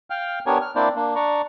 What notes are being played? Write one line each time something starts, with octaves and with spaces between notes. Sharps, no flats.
F5 G5 F6
B3 D4 G4 A#4 C#5 G#5
F6
A#3 C4 D4 E4 C5 D5
A#3 D4
D4 D5 A#5 C#6